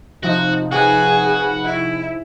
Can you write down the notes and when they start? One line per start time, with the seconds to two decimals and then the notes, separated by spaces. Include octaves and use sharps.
0.23 C3 F3 D#4 F#4
0.72 F#4 G#4 B4 F#5
1.65 E4